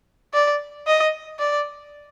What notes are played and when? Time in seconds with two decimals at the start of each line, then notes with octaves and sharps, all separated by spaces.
0.34 D5
0.87 D#5
1.39 D5